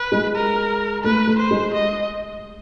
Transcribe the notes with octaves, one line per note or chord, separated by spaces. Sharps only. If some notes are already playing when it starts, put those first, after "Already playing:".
Already playing: B4
G#3
A#4
A3 B4
A3
C5
G#3
D#5